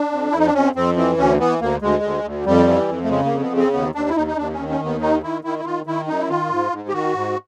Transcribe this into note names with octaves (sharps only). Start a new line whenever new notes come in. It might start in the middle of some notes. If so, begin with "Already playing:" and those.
Already playing: D4
F2
F2 E4
D#4
D4
F2 C#4
F2 C4
E3 C4
D2 C#4
E3 B3
D2 A#3
D2 G#3
D2
D2
F2 G3
E3
F2
A3
C#3 G#3
A#3
F2
B3
C#3
C4
D#2 B3
D#2 D4
E4
D#2 D#4
D#4
D#2 D4
C#4
D#3
C#4
D#2
B3
D#3 D#4
D#3 E4
D#3 E4
E4
D#3 F4
D#3 E4
F#2 D#4
E4
D#3 F4
G#2
G#2
G4
D#3 F#4
G#2